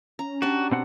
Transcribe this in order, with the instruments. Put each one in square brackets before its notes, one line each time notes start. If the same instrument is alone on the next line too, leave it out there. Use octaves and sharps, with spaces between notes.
[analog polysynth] C#4 [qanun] A#5
[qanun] D4 G4 D5 [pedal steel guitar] F#4
[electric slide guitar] B2 C4 F#5